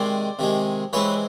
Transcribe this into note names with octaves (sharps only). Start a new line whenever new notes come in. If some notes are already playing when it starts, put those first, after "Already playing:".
Already playing: C3 D#3 G#3 C5 D5
C3 D#3 G#3
E3 G#3 C4 B4 C#5